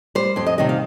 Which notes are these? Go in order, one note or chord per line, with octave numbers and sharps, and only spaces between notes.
G3 C5
F2 C5
D#5
C3 D#3 G3 D#5
F5